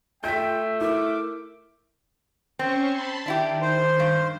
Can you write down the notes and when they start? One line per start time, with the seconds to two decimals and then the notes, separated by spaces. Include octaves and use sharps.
0.24 A3 F4 G5 G6 B6
0.81 E4 A#4 D6
2.59 C4 C#4 C5 C#6
2.92 A5 B5 C6
3.26 D#3 D4 E4 G4
3.61 C5
3.99 G2